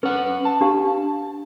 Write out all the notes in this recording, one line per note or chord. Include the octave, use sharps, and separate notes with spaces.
C#4 B4 F#5
A5
D4 G4 F5